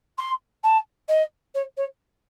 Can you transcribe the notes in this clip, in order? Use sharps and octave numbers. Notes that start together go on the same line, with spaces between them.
C6
A5
D#5
C#5
C#5